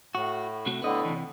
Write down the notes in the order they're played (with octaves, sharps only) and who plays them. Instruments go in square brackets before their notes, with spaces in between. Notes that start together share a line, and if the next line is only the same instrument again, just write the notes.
[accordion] A2 [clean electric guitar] F#4
[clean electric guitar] C3 A3 F#4
[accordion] A2 D3 [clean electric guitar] B3 D#5
[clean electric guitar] C3 E3